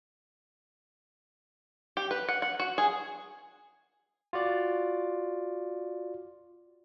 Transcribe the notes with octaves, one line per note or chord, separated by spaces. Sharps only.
G4
B4
F#5
F#5
F#4
G#4
F4 F#4 D5